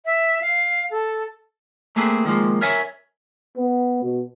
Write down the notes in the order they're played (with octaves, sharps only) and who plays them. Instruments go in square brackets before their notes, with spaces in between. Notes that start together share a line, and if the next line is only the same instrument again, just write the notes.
[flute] E5
F5
A4
[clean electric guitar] A3 A#3 C4 G#4 B4
D#3 F3 G#3 A#3
A#4 C#5 E5 G#5
[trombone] B3
B2